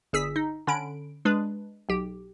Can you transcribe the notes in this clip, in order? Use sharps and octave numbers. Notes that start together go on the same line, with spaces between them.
G1 G#4 E6 B6
D#4
D3 C#4 B5 D7
G#3 D4 B4
B1 G4